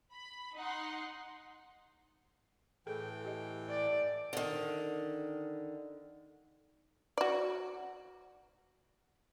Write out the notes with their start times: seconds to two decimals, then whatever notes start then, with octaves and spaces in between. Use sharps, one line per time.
0.11 B5
0.57 D#4 F#5 C6
2.87 A2 E3 G#4 A4 G5
3.25 G4 D#5
3.69 D5
4.33 D3 D#3
7.18 F#4 D5